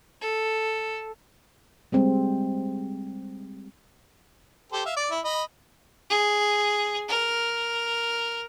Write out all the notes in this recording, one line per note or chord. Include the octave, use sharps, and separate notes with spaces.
A4
G3 G#3 C4
G4 A4 C5
E5 F5
D5 D6
E4
D#5 B5
G#4
A#4